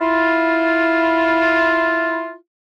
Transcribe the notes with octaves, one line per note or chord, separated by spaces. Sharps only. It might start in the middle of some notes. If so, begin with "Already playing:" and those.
E4 F4